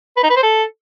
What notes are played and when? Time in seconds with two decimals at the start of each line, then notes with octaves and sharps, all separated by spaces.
0.17 B4
0.23 D#4
0.30 B4
0.36 C5
0.43 A4